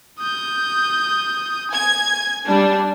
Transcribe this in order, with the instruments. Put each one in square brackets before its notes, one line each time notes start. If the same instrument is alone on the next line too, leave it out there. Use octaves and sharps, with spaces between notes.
[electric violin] D#6 G6
[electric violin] G#5 [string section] G#6
[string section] G3 D4